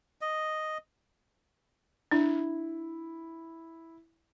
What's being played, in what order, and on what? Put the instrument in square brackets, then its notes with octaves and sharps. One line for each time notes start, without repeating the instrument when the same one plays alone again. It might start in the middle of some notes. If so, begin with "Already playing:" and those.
[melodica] D#5
[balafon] D4 [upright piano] E4